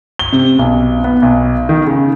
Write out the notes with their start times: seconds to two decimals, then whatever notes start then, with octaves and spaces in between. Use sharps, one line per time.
0.19 G7
0.33 C3
0.59 B1
1.04 B3
1.22 B1
1.69 D#3
1.86 C#3